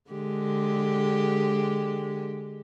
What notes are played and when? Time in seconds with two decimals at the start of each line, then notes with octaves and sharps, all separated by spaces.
0.10 D3 G#3 G4